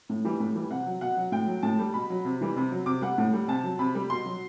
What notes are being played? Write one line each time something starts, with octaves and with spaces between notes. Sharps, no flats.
A2
E3 G3
A2
E3 G3
C3 F#5
F#3
B2 F#5
F#3
A2 G5
F#3
A2 A5
G3
B2 B5
F#3
C3
E3 G3
C3
F#3
C3 D6
G3 F#5
A2
G3
C3 A5
F#3
C3 B5
G3
B2 C6
F#3